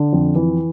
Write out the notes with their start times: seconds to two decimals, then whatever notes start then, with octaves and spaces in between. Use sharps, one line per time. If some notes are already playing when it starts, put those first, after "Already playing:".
Already playing: D3
0.13 F2
0.35 E3